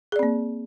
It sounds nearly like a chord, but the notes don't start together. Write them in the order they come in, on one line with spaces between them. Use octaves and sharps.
G#4 D5 C4 A#3